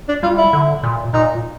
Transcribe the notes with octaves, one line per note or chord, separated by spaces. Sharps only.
D4
G3 F4
E4
D3
A#2
A#2 D#4